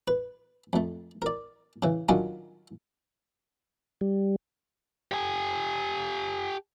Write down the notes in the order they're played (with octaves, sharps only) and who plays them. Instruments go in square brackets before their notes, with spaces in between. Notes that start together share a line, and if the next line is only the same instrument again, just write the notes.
[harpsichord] B4
F2 A3
A#4 D5
C#3 E3
D#3 F#3 C#4 D4 F4
[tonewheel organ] G3
[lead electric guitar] G4 G#5